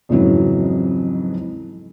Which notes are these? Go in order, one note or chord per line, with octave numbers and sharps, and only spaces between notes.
F2 G#2 C#3 E3 F#3